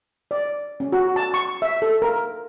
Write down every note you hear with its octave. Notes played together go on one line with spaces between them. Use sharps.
D5
C#4
F#4
A5
C#6
E5
A4
A#4